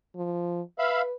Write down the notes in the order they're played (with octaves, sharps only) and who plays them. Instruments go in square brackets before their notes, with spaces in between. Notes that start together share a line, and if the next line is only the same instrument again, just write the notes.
[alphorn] F3
[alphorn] B4 [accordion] E5 F5 B5